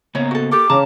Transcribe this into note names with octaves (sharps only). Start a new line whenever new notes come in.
C#3 A#3 B3 C#5 A#5
F#4 A4
G4 A4 A#4 D6
C#3 C#4 A5 A#5